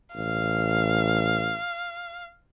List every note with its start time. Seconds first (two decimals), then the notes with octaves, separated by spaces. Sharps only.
0.15 A1 F5